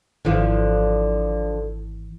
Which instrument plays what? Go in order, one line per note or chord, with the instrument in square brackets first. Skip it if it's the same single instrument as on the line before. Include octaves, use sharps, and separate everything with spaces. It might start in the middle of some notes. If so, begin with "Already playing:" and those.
[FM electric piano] G#1 E3 [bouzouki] D3 F3 D5